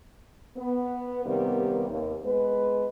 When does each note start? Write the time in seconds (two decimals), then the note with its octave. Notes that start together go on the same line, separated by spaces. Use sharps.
0.57 B3
1.24 C3 D#3 G3 A#3 B3
1.88 D#2
2.24 G#3 B3 B4